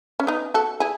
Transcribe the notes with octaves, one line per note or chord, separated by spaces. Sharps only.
C#4
B3 D#4
F#4 A4
E4 G#4